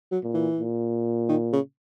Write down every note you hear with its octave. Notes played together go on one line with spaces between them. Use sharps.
F#3
A#2
E3
A#2
D#3
C#3